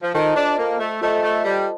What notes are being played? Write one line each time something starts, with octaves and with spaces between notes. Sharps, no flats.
F3
D#3 F4 A4 C5 D#5 A5
D4
A#3
A3
A3 F4 A4 C5 D#5 A5
A3
G3